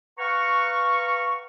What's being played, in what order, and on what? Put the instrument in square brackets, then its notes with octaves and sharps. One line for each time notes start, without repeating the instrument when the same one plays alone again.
[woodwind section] B4 F5 F#5 A#5 C#6